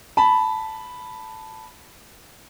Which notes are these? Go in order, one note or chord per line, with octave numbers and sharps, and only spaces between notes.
A5 B5